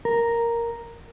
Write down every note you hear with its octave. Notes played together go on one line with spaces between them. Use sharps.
A#4